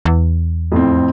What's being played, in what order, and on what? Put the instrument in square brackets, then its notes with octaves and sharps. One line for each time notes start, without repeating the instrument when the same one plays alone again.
[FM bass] E2
[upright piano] F2 A2 C4